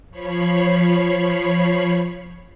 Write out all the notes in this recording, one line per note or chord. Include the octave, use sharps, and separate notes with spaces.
F3 C#5 B5 C7